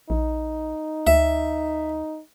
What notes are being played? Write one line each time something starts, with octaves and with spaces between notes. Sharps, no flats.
A#1 D#4
D2 E5